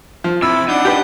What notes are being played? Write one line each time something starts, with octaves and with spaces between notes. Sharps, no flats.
F3
C3 E4 B5 E6
D4 D#4 F#5 G6
G4 B4